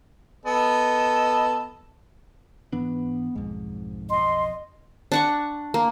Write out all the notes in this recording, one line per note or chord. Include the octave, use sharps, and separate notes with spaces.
B3 A4 D#5
G#2 E3 B3 D4
B1 F2 G#2
D#5 C6
D4 F#5 C#6
A#3